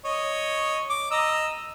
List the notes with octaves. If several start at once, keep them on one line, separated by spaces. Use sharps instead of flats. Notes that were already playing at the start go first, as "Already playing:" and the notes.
C#5 D#5
D6
D#5 A#5 E6